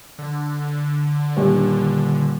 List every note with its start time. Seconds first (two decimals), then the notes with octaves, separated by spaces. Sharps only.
0.19 D3
1.37 D#1